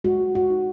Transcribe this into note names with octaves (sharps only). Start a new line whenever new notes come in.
G#3 F#4
F#4
D#4